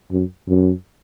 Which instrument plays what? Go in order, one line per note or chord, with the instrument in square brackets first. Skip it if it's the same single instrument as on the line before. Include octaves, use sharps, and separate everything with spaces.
[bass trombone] F#2
F#2